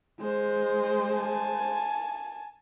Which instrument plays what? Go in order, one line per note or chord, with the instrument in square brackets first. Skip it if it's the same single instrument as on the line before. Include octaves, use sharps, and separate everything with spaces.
[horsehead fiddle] G#3 C5
[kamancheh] G#5 A5